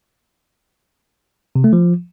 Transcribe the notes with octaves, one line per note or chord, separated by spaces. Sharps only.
C3
A3
F3